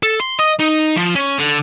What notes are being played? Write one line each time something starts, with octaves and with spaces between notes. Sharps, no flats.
A4
C6
D#5
D#4
F3
C#4
D3